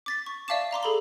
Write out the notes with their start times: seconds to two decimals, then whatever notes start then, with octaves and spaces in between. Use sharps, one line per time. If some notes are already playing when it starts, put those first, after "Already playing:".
0.06 D6 A6 B6
0.26 C#6
0.48 D5 E5 F5 A5 D6 E7
0.71 F5 A#5 C6 D6
0.83 G#4 A4 B5 G7